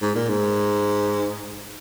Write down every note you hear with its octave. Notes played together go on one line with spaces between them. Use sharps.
G#2
A#2
G#2